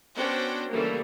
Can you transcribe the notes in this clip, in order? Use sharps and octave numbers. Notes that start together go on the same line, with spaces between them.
B3 C#4 D4 F#4 C5 G5
C#3 E3 G3 A3 A#3